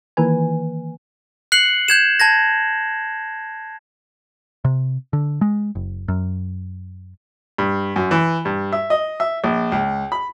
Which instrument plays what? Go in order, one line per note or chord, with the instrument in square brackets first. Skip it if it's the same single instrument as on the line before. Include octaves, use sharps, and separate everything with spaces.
[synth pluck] D#3 E3 A#3 B4 G#5
[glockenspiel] F#6 C7 C#7 F#7
G6 G#6 E7
A5 G#6 A#6
[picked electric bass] C3
D3
G#3
F#1
F#2
[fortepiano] G2
F#2
E3
G2
E5
D#5
E5
A#1
C#2
B5